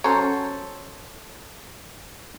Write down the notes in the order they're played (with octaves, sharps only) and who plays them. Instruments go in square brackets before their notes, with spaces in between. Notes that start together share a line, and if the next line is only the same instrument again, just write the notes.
[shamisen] F#3 C#4 A#5 [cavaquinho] A4 [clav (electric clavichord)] C5 C#5